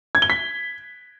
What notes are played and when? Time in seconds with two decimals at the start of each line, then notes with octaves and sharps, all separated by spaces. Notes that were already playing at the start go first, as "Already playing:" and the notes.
0.15 G#6
0.22 G7
0.30 B6